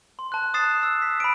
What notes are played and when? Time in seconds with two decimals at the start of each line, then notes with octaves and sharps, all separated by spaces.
0.19 C6
0.32 A5 F#6
0.54 D#6 F#6 A6 C7 E7
0.83 E6
1.02 B6
1.20 B5 D7